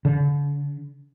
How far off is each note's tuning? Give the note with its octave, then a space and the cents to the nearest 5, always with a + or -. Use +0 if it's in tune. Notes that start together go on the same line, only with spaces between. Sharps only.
D3 -35